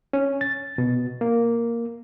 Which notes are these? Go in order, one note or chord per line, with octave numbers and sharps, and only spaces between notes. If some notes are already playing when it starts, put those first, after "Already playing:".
C#4
A6
B2
A#3